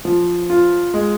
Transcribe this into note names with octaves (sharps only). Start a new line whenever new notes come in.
F3
F4
G#3